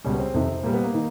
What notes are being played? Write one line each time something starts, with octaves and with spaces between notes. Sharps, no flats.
C#2 B2 G3 C#4
B3
C4
F2 C3 D#3
A#2 G3 A#3
B3
A#3
D#3